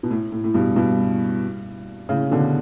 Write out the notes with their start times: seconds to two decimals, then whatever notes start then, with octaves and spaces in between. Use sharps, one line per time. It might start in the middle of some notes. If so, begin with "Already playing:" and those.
0.03 B2
0.10 A2
0.32 A2
0.44 A2
0.54 G2 B2
0.76 G2 B2
2.09 A2 C#3
2.31 B2 D3